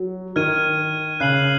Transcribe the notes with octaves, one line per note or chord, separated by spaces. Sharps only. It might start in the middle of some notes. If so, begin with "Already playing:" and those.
Already playing: F#3
D#3 F6 G#6 D#7
C#3 F#6 C7 F#7